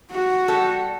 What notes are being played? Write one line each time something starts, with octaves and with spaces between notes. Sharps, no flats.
F#4
G3 A4